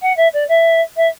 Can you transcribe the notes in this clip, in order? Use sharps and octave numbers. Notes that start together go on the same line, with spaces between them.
F#5
E5
D5
E5
E5